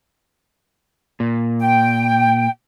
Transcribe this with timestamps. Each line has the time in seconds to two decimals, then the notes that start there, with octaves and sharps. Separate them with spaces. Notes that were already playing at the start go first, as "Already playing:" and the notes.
1.20 A#2
1.60 G5